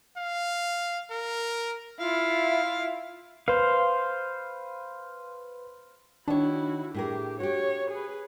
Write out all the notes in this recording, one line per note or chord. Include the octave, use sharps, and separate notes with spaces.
F5
A#4
E4 F4 F5
B4 C5 F5
D#3 D4 E4 F#4 C#5
A2 G4 G#4 A#4
F#4 G4 C#5
G#4 B4